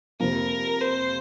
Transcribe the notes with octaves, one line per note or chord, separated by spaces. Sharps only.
F2 C3 F3 A#3 A#4
C5